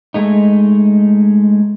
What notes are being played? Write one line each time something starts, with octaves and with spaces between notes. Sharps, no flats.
G#3 A3 D#4